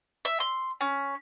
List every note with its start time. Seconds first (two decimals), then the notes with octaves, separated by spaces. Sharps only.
0.25 E5
0.40 C6
0.81 C#4